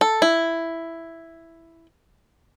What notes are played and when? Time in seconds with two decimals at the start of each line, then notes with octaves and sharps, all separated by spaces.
0.01 A4
0.22 E4